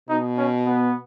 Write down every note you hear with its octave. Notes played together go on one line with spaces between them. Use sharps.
B2 D#4
C#4
B3